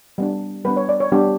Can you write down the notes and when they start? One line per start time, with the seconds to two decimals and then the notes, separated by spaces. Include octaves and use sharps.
0.18 G3 B3 D4
0.64 G3 B3 D4 B4
0.77 C#5
0.89 D5
1.00 C#5
1.12 G3 B3 D4 G4